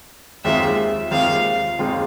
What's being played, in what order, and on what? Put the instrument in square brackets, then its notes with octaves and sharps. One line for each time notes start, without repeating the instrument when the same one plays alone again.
[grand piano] D#2 D#3 G#3 C4 F4 [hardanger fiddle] E5
[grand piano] D#2 D#3 G#3 C4 F4 [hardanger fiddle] F5
[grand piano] D#2 D#3 G#3 C4 F4